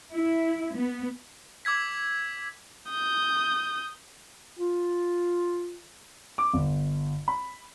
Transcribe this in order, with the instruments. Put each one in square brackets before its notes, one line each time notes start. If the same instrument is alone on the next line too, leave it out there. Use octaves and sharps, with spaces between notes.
[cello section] E4
B3
[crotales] D6 E6 G#6 B6
[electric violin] D#6 G6
[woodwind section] F4
[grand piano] D6
G1
B5